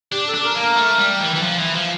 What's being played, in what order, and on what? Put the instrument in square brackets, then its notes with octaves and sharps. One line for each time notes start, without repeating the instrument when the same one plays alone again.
[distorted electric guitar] D4 [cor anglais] G4
[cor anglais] A4
[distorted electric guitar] D4
[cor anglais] A#4
[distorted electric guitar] A#3
[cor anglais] A#4
[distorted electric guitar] A3
G3
E3
E3
F3
E3
F3